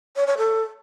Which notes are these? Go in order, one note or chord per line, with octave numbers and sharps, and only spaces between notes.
C#5
C#5
A4